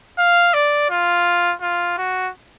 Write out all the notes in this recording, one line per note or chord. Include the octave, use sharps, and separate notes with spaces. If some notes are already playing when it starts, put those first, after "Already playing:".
F5
D5
F4
F4
F#4